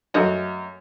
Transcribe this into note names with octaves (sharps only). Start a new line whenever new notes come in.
F#2 A3 F#4 D#5